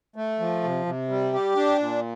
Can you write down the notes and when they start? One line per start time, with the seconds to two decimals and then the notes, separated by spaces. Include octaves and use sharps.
0.16 A3
0.40 F3
0.63 C3
0.86 C3
1.09 G3
1.33 G4
1.56 D4
1.79 A#2